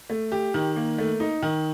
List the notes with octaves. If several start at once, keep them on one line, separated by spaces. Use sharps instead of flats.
A3
G4
D#3
A#3
A3
D#4
D#3